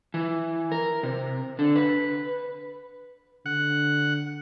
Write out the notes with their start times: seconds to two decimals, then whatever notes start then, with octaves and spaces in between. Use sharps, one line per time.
0.14 E3
0.72 A#4
1.03 C3
1.59 D3
1.76 B4
3.46 D3 F#5